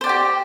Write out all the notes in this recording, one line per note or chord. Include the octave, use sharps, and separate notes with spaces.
G4 C5 D5 G5